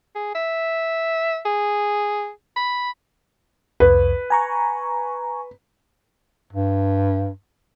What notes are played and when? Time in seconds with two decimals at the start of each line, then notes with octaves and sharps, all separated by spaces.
0.16 G#4
0.35 E5
1.46 G#4
2.56 B5
3.80 C2 F2 B4
4.30 G#5 A#5 C#6
6.53 G2